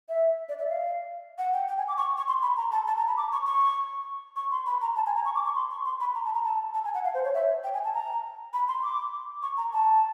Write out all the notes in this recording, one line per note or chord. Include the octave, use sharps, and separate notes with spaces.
E5
D5
E5
F5
F#5
G5
G5
G#5
D6
C#6
C#6
C6
B5
A#5
A5
A5
A#5
B5
D6
C#6
C#6
C#6
C6
B5
A#5
A5
G#5
A#5
C#6
D6
C#6
C6
C#6
C6
B5
A#5
A5
A#5
A5
A5
G#5
F#5
F5
C5
C#5
E5
G5
G#5
A5
A#5
B5
C6
D6
C#6
A#5
A5